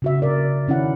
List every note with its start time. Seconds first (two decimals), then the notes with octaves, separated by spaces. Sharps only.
0.02 C#3 F#4 E5
0.22 A#4 D5
0.68 D#3 C#4 E4 F#5